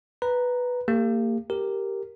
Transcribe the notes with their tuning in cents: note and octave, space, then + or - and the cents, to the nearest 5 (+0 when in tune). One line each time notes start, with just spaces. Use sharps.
B4 +0 A#5 +0
A#3 -30 G4 +30
G4 +0 A#4 -5